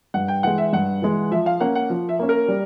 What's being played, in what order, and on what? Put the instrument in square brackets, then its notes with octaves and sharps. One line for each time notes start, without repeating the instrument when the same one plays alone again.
[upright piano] G2 [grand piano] F#5
[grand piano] G5
[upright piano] E3 G#3 [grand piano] F#5
[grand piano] E5
[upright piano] G2 [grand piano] F#5
[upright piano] E3 G#3
[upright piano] F3 [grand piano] E5
[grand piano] F5
[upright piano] A#3 C#4 [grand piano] F#5
[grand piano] F#5
[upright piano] F3
[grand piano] E5
[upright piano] A#3 C#4
[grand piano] A#4
[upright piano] G3